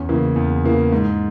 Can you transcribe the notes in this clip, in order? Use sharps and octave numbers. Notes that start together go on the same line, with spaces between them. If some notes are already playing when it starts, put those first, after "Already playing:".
Already playing: E2 C#4
C#3 E3 A#3
E2
C#3 E3 A#3
G#2